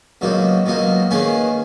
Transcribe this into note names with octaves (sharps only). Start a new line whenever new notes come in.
C#2 B2 F#3 A#3 D#4
C#2 B2 F#3 A#3 D#4
D#3 A#3 C#4 G#4 B4